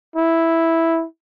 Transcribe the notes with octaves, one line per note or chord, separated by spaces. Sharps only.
E4